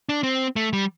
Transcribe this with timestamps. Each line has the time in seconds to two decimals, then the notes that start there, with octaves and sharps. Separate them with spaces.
0.09 D4
0.23 C4
0.56 A3
0.73 G3